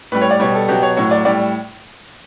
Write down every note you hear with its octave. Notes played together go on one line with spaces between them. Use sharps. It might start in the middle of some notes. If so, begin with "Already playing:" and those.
A2 G3 B4
C#5
D5
B2 G3 C#5
A4
B2 F#3 G4
C#5
A2 F#3 C#5
D5
A2 G3 D5